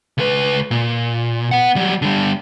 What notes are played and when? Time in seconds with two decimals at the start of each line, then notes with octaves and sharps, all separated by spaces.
0.18 C#2 B4
0.71 A#2
1.51 B3 F#5
1.76 F#3 G3
2.02 D3 G3